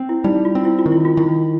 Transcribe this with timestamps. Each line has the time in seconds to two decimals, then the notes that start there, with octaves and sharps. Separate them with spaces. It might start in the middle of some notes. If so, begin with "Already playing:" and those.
Already playing: C4
0.09 E4
0.24 G3 D#4
0.45 F4
0.55 C4
0.65 E4
0.79 F4
0.86 D#3
0.92 E4
1.05 F4
1.17 D#3 E4